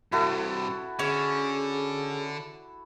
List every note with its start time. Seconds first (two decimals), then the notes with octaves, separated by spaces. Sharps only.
0.12 G2 C3 E4 F#4 A4
0.99 D3 C#4 G#4